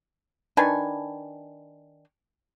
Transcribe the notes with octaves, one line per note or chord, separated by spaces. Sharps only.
D#3 D4 B4 G#5